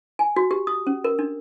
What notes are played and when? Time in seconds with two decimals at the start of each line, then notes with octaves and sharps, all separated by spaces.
0.19 G#5
0.36 F#4
0.51 G4
0.67 D#6
0.87 C#4
1.04 A#4
1.19 D4